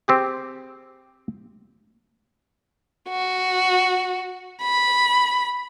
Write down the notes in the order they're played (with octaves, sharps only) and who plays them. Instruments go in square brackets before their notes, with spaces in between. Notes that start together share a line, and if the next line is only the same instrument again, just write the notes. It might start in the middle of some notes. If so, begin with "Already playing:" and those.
[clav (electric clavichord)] C4 G4 G#4
[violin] F#4
B5